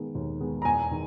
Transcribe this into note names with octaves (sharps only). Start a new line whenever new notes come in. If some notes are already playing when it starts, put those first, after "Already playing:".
Already playing: D#3 G#3 B3
D#2
D#3 G#3 B3
A#5
E2 G#5
D#3